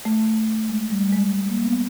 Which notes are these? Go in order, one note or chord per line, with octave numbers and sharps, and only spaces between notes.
A3
G#3
G3
G#3
G#3
A#3
B3